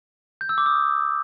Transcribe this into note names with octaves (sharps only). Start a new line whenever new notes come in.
G6
E6
D6
D#6